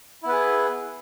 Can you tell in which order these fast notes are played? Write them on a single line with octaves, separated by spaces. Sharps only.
E4 B3 B4 G#4